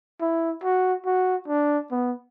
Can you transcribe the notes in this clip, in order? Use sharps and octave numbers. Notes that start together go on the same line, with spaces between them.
E4
F#4
F#4
D4
B3